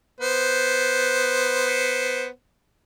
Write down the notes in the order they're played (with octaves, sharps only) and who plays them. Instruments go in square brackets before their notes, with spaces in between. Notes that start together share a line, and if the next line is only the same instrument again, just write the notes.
[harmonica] B3 C5